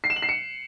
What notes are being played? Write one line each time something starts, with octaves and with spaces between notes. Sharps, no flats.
C7
E7
F#7
C7
C#7